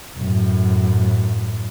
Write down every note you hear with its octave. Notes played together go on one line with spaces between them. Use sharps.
F#2 A2